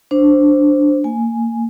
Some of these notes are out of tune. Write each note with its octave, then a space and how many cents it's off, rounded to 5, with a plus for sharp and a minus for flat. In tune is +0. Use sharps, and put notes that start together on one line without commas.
D4 +0 C5 +0
A#3 -25 G#5 +5